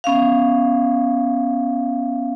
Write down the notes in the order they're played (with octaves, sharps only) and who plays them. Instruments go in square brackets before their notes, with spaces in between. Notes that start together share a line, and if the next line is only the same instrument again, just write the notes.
[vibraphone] B3 C#4 E5 F5